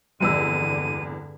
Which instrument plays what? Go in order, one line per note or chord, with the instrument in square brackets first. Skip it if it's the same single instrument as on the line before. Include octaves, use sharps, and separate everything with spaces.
[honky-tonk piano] F1 E2 E6 [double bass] G2 D3 [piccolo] D#7